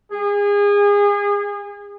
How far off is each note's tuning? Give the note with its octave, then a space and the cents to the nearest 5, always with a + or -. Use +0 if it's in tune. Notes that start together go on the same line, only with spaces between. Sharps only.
G#4 -30